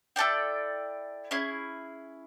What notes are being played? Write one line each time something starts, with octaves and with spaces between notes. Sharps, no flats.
E4 A4 D5 G5
C#4 E4 G#4